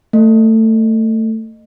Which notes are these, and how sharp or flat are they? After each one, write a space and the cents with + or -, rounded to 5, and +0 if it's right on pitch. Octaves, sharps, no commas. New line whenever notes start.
A3 +20